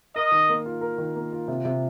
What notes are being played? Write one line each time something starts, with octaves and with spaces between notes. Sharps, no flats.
A#4 D#5
D#3
A#3
F4
A#4
D#3
A#3
F4
C3
C3